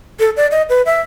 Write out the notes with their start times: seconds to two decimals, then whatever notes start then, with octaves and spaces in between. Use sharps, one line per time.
0.20 A4
0.37 D5
0.51 D#5
0.69 B4
0.86 E5